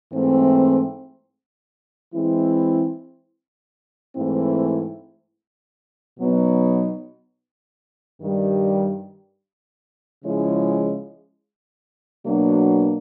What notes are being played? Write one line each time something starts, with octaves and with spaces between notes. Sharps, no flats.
G#2 E3 A3 C4
E3 G#3 C4 E4
G#2 E3 A3 C4 E4
B2 F#3 B3 D#4
G2 D#3 G3
C#3 F3 G#3 C#4 E4
B2 F#3 A#3 D4